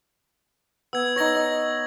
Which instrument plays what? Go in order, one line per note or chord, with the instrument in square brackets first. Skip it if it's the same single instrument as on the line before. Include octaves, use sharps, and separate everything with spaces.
[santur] B3 [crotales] E6 G#6
[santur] D#4 C#5 [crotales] G#6 A#6 F#7
[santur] D#5